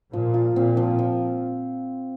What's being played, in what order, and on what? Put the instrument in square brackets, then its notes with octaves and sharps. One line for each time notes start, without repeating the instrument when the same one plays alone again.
[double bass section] A#2 [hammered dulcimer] F3
[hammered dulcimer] F4
[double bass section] A#2 [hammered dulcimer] C4
[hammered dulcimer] F3
F3